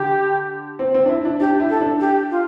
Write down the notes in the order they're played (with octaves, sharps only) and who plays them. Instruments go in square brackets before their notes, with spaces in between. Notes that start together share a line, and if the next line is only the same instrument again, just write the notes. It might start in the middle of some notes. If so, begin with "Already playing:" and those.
Already playing: [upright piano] D3 [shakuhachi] G4
[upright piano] C4
C4
D4
E4
D4
[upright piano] D4 [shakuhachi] G4
[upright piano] E4
[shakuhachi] A4
[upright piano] D4
[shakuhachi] G4
F4